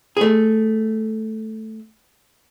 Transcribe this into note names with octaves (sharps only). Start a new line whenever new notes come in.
A3 G#4